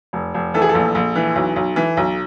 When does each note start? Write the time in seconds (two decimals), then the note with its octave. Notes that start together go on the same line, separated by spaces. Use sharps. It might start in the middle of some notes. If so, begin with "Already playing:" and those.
0.13 F1
0.34 F1
0.54 E3 A4
0.62 G#4
0.69 A4
0.75 A#1
0.95 A#1
1.15 E3
1.35 B1
1.56 B1
1.76 E3
1.97 B1